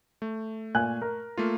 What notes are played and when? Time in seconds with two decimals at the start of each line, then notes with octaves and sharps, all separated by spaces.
0.22 A3
0.75 A#2 G#5 F#6
1.02 A#4
1.38 A3 A#3 F4